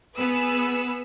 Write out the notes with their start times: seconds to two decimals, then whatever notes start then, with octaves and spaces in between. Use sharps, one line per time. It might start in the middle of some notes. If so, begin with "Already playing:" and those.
0.18 B3 G#4 B4 E6